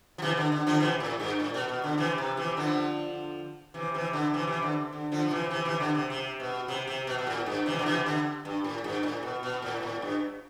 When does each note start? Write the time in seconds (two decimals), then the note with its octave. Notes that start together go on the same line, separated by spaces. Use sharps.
0.18 F3
0.22 C3 E3
0.37 D3
0.52 D3
0.67 D3 F3
0.80 C3 E3
1.00 A2
1.20 G2
1.40 A2
1.54 B2
1.69 B2
1.84 D3
1.98 C3 E3
2.18 C3
2.37 C3 E3
2.57 D3 F3
3.74 C3 E3
3.94 C3 E3
4.13 D3
4.34 C3 E3
4.48 C3 E3
4.63 D3
4.93 D3
5.12 D3 F3
5.25 F3
5.31 C3 E3
5.51 C3 E3
5.65 C3 E3
5.80 D3
5.95 C3
6.10 C3
6.40 B2
6.68 C3
6.88 C3
7.07 B2
7.18 B2
7.27 A2
7.46 G2
7.66 C3 E3
7.79 D3
7.86 C3 E3
8.06 D3
8.45 G2
8.64 A2
8.84 G2
9.03 A2
9.23 B2
9.43 B2
9.62 A2
9.77 B2
9.83 A2
10.02 G2